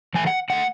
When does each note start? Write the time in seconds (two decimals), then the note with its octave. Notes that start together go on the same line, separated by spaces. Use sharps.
0.14 A2 E3 A3 G#5
0.27 F#5
0.50 D3 A3 F#5